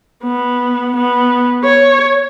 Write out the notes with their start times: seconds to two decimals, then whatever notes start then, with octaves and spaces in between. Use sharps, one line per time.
0.23 B3
0.96 B3
1.64 C#5